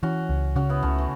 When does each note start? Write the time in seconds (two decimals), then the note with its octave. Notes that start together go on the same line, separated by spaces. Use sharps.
0.03 E3 C#4 F#4
0.29 C#2
0.55 C#3 C#4 F#4
0.69 B3 E4
0.83 C#2 A3 C#4
0.98 E3